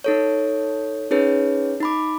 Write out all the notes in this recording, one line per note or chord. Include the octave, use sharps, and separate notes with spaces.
D#4 A4 C#5
C#4 D#4 G#4 B4 C#5
D#4 B5 D6